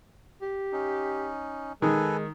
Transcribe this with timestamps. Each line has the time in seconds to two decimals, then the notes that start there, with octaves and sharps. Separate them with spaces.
0.42 G4
0.72 C#4 D#4
1.82 D#3 G#3 A4 B4 G#5